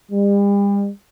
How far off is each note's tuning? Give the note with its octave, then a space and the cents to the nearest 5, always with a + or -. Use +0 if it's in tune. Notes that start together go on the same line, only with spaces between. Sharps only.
G3 +40